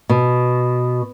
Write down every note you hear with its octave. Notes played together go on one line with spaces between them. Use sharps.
B2